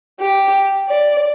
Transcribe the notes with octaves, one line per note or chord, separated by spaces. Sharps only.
G4
D5